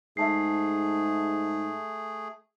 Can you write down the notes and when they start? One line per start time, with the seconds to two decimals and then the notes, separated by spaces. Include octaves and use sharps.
0.17 G#2 A3 G#4 E5 A5 C7